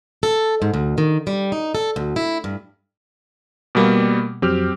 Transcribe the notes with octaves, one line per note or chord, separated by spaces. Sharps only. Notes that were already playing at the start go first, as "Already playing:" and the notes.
A4
G#2
D2
D#3
G3
D#4
A4
D2
E4
G2
B2 G3 A#3 B5 D6
F2 F#3 C4 G4 F6